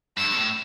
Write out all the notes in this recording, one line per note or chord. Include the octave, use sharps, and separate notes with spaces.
G2 E6
B2
A2